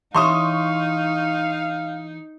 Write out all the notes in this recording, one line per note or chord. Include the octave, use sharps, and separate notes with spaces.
E3 D#4 C#5 E5 F5 C6 C#6 D#6